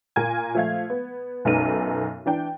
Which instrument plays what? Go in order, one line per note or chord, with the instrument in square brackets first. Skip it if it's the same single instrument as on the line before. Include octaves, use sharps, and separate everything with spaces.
[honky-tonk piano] A#2 A#4 G#5 G#6
F3 A3 F5 G#6
B3
B1 F#2 B3 D#4 A4 D#7
E3 D4 G5